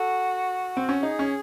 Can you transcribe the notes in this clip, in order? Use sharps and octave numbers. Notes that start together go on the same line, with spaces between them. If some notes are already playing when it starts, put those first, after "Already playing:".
Already playing: F#4 A4
C4
C#4
D#4 G#4
C#4